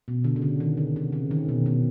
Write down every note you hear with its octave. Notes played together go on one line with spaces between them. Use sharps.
B2
D3
C#3
D3
D#3
D3
C3
C#3
D#3
B2
B2